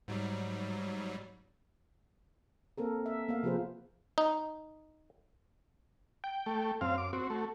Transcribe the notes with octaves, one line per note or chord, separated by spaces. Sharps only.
G#2 F#3 G3
A#3 C4 A4 A#4
E5
A#3 B3 F5
C3 F3 F4 G#4 B4 C5
D#4
G5
A3
F#2 C4 F5
D6
C4 F#4
A3